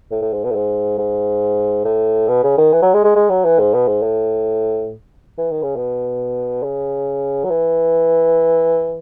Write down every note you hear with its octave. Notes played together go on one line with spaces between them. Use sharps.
A2
A2
G#2
B2
A2
G#2
G#2
A2
B2
C#3
D#3
E3
F#3
G#3
G#3
G#3
F#3
E3
G#2
B2
G#2
A2
E3
D#3
C#3
B2
C#3
F#3
E3